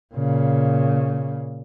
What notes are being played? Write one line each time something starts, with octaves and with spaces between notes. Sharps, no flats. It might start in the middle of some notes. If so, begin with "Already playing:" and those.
A#2 C#3